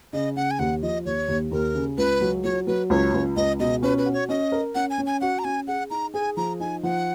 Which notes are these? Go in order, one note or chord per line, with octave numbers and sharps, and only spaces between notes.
C#3 D#5
C#3 F#5
G#5
D#2 F#5
F3 D#5
D#2 C#5
D#2
D#2 A#4
C#3
C#2 B4
F#3
F#3 C#5
F#3 B4
C#2 C#5
C#2
C#2 D#5
B2 D#5
C#4 B4
B4
F#4
C#5
C#4 D#5
A#4
C#4 F#5
G#5
C#4
G#5
F#4 F#5
A#5
C#4 G#5
G#4 F#5
D#4 A#5
G#4 G#5
F3 A#5
D#4 G#5
F3 F#5